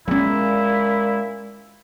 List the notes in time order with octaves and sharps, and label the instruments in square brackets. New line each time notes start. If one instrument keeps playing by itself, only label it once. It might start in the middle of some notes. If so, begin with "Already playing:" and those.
[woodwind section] A#2 E4 [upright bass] G#3 C#4